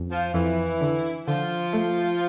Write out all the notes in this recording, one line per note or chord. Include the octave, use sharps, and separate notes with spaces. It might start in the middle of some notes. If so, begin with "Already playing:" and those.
Already playing: F2
F3 F4
F2 E3 E4
D3
D3 F3 F4
A3